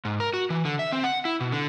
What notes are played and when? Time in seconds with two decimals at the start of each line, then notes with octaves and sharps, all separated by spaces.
0.05 G#2
0.20 A#4
0.34 F#4
0.50 E3
0.65 D3
0.79 E5
0.92 C4
1.04 F#5
1.25 E4
1.40 B2
1.52 D3